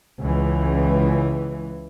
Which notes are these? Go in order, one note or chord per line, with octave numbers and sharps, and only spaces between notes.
C#2 E3